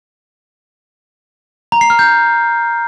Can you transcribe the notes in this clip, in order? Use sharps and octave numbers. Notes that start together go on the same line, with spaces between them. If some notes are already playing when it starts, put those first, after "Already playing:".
A#5
C7
F6
G6